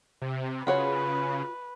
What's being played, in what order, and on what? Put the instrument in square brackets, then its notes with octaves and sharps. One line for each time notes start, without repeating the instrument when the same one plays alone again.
[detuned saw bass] C3
[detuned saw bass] C#3 [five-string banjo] F4 F#4 C#5 [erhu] B4